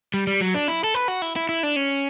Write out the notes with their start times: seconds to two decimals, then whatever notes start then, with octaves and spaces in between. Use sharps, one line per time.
0.14 G3
0.27 G3
0.41 F#3
0.55 D4
0.68 E4
0.84 A4
0.94 B4
1.08 F#4
1.22 E4
1.36 E4
1.49 E4
1.63 D4
1.76 C#4